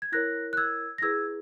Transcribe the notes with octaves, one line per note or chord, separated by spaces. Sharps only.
G#6
E4 A#4 C#5 F#6 A#6
F#6
E6 G#6
A#6
E4 G#4 B4 E6 G#6